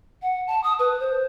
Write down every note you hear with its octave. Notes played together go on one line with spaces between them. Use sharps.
F#5
A5
D#6
B4
C5